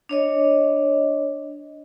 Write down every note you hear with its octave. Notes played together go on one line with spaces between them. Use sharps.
D4 C#5 D#5